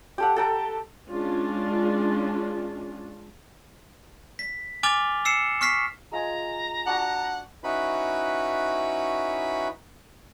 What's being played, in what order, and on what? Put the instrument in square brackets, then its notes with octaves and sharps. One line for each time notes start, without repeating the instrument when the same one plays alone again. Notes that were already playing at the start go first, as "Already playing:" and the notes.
[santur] G4 A4 F#5
A4 G5 A#5
[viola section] G#3 C#4 D4 F4
[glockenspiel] B6
G#5 D6 F6 A6 F7 G7
E6 C7 C#7 E7
C#6 F6 B6 C7
[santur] G#3 F4 G#5 [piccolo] A#5
[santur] D4 F#4 A5 [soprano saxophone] F#5
[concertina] C#4 D#4 E4 F#4 B4 B5